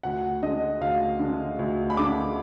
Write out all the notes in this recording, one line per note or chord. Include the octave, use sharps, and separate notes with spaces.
D2 F#5
D3 G#3 D#5
D2 F5
D3 G#3
D2
B5
D3 G#3 D6